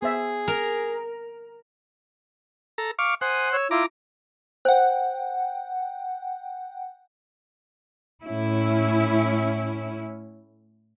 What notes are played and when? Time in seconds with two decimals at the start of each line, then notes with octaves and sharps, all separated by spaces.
0.02 B3 G#4 C5 E5
0.48 A#4
2.78 A4 A#5
2.99 F5 C#6 D6
3.21 C5 F#5 G#5 D#6
3.53 C#5 E6
3.71 E4 F4 A#5 D6
4.65 C5 F#5 G5
8.24 A2 C#4 E4